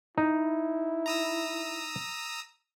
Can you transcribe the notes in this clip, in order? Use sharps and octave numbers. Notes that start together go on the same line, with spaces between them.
D#4 E4
A#5 D#6 E6